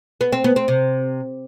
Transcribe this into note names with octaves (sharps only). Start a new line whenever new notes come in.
B3
C4
B3
C4
C3